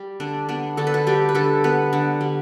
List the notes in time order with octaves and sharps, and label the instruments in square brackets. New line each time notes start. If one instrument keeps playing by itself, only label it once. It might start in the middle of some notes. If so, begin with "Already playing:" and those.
Already playing: [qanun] G3
D3 D4
B3 D4
D3 A4
B4
A4
G3 G4
B4
D3 A4
B3 B4
D3
G3